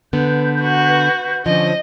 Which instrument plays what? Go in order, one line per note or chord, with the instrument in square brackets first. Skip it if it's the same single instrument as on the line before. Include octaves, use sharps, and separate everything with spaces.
[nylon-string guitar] D3 B3 [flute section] B4 G6
[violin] F#4
[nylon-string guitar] D3 F3 [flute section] C#4 D4 C5 [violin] D#5